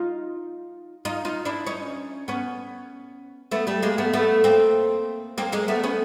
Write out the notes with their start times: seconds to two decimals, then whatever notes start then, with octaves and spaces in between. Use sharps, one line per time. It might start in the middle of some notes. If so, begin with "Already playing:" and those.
Already playing: D#4 F4
1.05 D#4 F4
1.25 D#4 F4
1.45 D4 E4
1.66 C#4 D#4
2.28 B3 C#4
3.51 A3 B3
3.67 G3 A3
3.82 G#3 A#3
3.98 A3 B3
4.13 A3 B3
4.44 A#3 C4
5.38 A#3 C4
5.52 G#3 A#3
5.68 A3 B3
5.84 B3 C#4